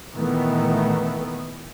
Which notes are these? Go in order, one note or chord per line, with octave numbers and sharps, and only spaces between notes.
A#2 D#3 E3 A3 B3